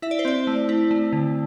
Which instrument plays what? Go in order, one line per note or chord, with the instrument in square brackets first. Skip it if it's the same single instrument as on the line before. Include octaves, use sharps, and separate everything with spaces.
[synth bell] E4 E5
D5
C5
C4 D5
A3
E4
A3
D3